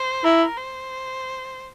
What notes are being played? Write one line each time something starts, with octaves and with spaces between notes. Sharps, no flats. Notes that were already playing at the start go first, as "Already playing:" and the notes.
Already playing: C5
E4 A#4
C5